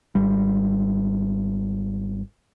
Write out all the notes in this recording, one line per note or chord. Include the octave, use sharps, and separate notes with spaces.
G#1 G3